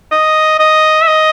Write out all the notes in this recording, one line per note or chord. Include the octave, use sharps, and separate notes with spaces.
D#5
D#5
E5
D#5